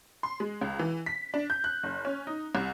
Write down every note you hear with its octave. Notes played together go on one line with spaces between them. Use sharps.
C6
G#3
C#2
E3
B6
D4
G6
F#6
F#1
C#4
D#4
C2